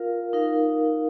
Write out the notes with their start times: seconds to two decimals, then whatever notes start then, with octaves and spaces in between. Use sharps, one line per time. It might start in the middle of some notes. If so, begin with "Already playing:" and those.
Already playing: F4 A#4 F5
0.33 D#4 A#4 F5